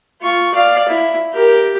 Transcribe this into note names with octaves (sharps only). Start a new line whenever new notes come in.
F4 C#6
D5 F5
E4
G4 A#4